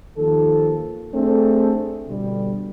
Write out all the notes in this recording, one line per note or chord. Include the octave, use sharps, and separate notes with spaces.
D#2 D#3 F3 A4
A3 C4 D4 G#4 A4
B2 D3 G3